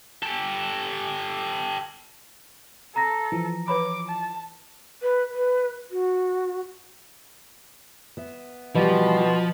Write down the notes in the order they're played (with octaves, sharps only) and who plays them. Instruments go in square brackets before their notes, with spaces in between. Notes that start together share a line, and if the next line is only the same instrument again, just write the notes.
[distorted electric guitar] G4 A4
[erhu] A4 [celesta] A#5 A#6
[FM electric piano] E3 F3
[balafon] B4 C#5 B5 [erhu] D6
[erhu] A5
[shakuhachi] B4
B4
F#4
[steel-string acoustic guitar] B3 E5
[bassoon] B2 [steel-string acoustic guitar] E3 G3 G4 [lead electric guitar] F3